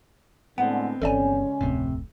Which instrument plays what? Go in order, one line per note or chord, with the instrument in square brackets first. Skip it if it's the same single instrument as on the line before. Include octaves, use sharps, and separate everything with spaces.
[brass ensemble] A2 D3 G#3 [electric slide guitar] B3 C4 [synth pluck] F#5
[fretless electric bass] G1 E3 [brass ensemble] C#3 G#3 C#4 [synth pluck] A4 D5 G#5
[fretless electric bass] F1 D2 A2 [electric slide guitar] C3